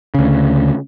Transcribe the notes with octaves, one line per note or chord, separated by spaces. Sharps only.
D2 C#3